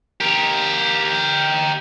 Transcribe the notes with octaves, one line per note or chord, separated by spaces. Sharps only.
G4 A#4